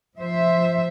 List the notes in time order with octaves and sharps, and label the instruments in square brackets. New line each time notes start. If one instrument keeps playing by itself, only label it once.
[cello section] F3 C5 E5